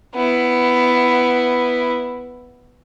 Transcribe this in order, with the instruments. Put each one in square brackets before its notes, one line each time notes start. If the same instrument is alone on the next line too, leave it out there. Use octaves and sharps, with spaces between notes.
[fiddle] B3 E4